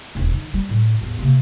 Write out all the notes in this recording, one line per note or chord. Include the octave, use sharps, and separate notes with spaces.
E1 D#2
D#3
G3
A2
A1 E2
C3 A#3